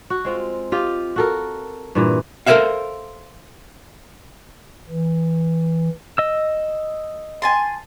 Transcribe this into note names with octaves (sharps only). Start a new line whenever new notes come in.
F#4
G#3 C4 F4
F4 G4 D#5
F#4 A4 A#4
G2 A#2 E3
A4 A#4 C5 C#5 E5 F5
E3
D#5 E6
G#5 A5 C6